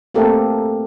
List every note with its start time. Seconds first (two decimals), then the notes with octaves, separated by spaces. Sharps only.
0.14 A3 A#3 C4 G4 A4 A#4